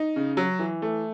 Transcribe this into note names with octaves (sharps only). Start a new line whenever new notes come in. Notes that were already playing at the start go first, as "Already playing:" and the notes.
Already playing: D#4
C#3
F#3
E3
A3